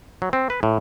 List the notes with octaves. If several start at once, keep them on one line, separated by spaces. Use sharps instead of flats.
F#3
C4
B4
A2